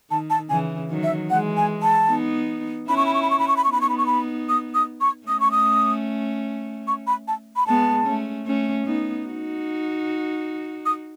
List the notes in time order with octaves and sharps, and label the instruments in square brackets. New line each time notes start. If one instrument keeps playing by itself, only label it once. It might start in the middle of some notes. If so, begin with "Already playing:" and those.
[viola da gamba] D#3 [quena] A5
[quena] A5
[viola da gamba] C#3 E3 [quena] G#5
[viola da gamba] D#3 F#3
[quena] E5
[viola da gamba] E3 G#3 [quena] F#5
[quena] G#5
A5
[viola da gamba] B3 D#4
[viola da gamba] C#4 E4 [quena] B5
[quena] C#6
B5
C#6
B5
C#6
B5
C#6
B5
C#6
[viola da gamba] B3 D#4 [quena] B5
[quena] C#6
B5
C#6
B5
D#6
D#6
C#6
[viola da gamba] A3 C#4 [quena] D#6
[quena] C#6
D#6
C#6
B5
A5
B5
[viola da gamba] G#3 B3 [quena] A5
[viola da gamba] A3 C#4
A3 C#4
B3 D#4
D#4 F#4
[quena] D#6